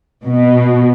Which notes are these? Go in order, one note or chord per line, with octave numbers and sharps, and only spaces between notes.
B2